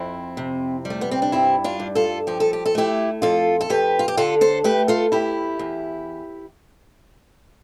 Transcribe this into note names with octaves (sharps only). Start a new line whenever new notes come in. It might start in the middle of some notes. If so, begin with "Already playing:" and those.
Already playing: F2 C4 E4
C3
G3
A3
B3
C4
D4
G2 C4 E4
D4 F4
G2
F4 A4
F3 G4
A4
G4
A4
A3 E4 G4
F2 F4 A4
A4
F2 G4 B4
F4
G4
D3 F4 A4
A4 C5
A3 G4 B4
F4 A4
E2 E4 G4
E2